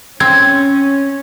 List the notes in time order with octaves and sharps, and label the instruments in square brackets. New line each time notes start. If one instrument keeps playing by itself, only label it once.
[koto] C4 [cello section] C#4 [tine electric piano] G#6